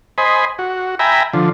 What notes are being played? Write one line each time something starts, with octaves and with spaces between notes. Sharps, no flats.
C5 D#5 G#5 B5
F#4
E5 G5 G#5 A#5 B5
D3 F3